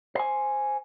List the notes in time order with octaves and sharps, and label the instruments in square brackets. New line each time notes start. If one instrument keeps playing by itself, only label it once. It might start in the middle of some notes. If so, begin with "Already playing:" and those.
[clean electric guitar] C5 G#5